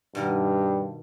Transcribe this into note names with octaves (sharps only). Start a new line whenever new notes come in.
G2 B2 D#3 A#4